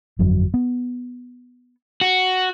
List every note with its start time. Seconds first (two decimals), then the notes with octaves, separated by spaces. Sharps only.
0.19 G1 F2 F#3
0.54 B3
2.01 F#4